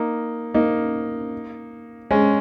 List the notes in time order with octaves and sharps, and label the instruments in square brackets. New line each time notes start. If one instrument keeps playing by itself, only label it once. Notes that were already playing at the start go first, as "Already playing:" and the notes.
Already playing: [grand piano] A#3 D#4
A#3 D#4
G#3 C#4